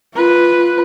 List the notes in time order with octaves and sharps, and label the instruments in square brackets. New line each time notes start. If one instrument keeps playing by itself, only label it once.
[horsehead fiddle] F4 B4